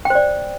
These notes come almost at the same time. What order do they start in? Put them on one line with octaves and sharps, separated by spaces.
G5 C5 D5